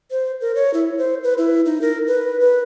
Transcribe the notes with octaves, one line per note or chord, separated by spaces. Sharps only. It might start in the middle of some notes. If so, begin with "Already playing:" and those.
C5
A#4
C#5
E4
C5
B4
E4
D#4
A#4
B4
B4